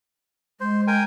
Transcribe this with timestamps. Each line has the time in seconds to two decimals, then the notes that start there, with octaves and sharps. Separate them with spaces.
0.61 G#3 C5
0.87 A#4 G5 G#5